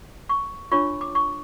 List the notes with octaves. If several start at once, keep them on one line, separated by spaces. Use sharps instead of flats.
C#6
D4 F4 C#5 C#6
D6
C#6